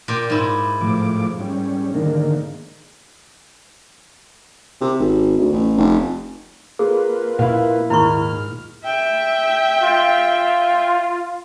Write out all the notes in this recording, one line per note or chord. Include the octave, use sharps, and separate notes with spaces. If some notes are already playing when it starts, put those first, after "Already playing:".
A#2 G4
G#2 E4
A2 F3 D6
G3 C#4
D3 D#3 A#3
C3
G#1
D2
A1
F1
A#3 F4 G#4 B4
A#2 E4 F5
D#2 G#2 E4 B5 C#6 F6
E5 G5
F4